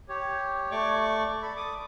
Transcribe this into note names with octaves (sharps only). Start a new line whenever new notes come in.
G4 C#5
A3 D5 C#6 D6
A4 B5
D6 D#6